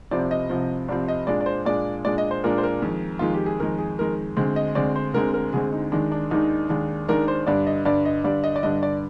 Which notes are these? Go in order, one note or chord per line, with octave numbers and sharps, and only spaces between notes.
C2 C3 F3 C4 D5
D#5
C2 C3 F3 C4
C2 C3 F3 C4 D5
D#5
A#2 G#3 D4 D5
D5
C5
A#2 G#3 D4 D5
A#2 G#3 D4 D5
D#5
C5
A#2 G#3 D4 A#4
C5
A#4
F2 D#3 G#3
F2 D#3 G#3 F4
G4
G#4
F2 D#3 G#3 A#4
G#4
F2 D#3 G#3 A#4
D2 D3 G#3 C4
D#5
D2 D3 G#3 C4 D5
C5
D2 D3 G#3 C4 A#4
A#4
D2 D3 G#3 C4 G#4
D#4
D#2 D#3 G#3 D4
D4
D#2 D#3 G#3 D4 D#4
D#2 D#3 G#3 D4
D#2 D#3 G#3 D4 A#4
C5
G2 D3 G3 D4 D5
D#5
G2 D3 G3 D4 D5
D#5
G2 D3 G3 D4 D5
D#5
D5
G2 D3 G3 D4 D#5
D5